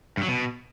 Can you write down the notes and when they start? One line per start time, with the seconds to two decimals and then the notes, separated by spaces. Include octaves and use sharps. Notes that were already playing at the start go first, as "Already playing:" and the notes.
0.17 G2
0.23 F#3
0.28 B2